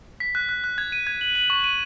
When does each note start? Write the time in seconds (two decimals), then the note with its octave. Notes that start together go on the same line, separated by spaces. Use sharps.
0.20 B6
0.35 F#6
0.49 F#6
0.64 F#6
0.78 G#6
0.92 D#7
1.07 G#6
1.21 F#7
1.35 F#7
1.50 C#6
1.64 D#7